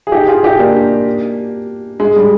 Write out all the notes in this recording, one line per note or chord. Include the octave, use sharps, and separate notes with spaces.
G#4
D#4 G4
F4 G#4
D#4 G4
A#3 D4
G#3
G3